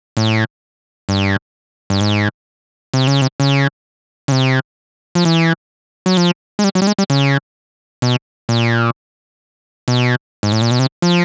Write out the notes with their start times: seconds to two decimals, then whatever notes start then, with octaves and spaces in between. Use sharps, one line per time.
0.17 A2
1.09 G2
1.90 G2
2.01 G#2
2.94 C3
3.07 C#3
3.22 C3
3.40 C#3
4.28 C#3
4.32 C3
5.15 F3
5.25 E3
6.06 F#3
6.17 F3
6.59 G#3
6.64 G3
6.75 F#3
6.82 G3
6.87 G#3
6.98 G3
7.10 C#3
8.02 B2
8.49 A#2
9.88 B2
10.43 G#2
10.52 A2
10.62 A#2
10.71 B2
10.79 C3
11.02 F3